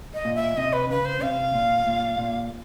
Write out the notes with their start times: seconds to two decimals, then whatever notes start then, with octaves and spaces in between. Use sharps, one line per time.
0.14 D#5
0.25 A#2
0.35 E5
0.57 C3 D#5
0.73 B4
0.90 C#3 B4
1.05 C5
1.22 C3 F5
1.54 A#2
1.87 A#2
2.19 A#2